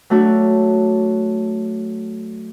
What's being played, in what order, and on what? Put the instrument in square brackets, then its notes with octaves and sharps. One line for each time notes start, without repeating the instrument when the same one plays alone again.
[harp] F#3 A3 D4 F#4